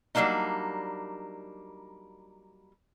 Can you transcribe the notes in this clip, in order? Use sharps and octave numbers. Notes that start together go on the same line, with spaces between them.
F#3 G3 A#3 D4 D#4